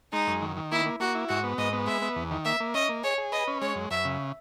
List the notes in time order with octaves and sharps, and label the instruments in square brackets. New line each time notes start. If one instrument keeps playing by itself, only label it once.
[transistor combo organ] G#3 [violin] D#4
[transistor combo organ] F#2
D#3
D#3
[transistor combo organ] A#3 [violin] E4
[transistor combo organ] A#3
[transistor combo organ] A#3 [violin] F#4
[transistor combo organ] E4
[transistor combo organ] G#2 [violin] F#4
[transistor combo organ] B3
[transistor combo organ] G#2 [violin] D#5
[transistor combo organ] B3
[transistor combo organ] G#3 [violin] E5
[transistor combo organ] B3
E2
D#3
[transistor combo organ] A#3 [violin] E5
[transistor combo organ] A#3
[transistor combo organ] C#4 [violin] D#5
[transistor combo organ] A#3
[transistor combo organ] G#4 [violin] C#5
[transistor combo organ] G#4
[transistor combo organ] B4 [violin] D#5
[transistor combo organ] C#4
[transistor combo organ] G#3 [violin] C#5
[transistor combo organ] F#2
[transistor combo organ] F#2 [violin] E5
[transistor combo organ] C#3